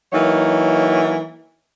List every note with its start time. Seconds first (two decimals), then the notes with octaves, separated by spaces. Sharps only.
0.12 E3 F#3 A#3 D#4 C#5